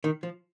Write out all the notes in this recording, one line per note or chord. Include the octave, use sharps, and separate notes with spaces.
D#3
F3